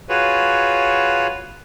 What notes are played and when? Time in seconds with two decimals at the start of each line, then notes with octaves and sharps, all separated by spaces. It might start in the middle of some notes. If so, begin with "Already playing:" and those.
0.09 F4 F#4 G#4 B4 C#5